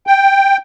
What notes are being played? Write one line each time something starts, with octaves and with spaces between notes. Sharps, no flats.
G5